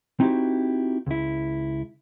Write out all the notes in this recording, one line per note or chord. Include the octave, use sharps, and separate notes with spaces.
C4 D#4 E4 F#4 G4
C#2 E4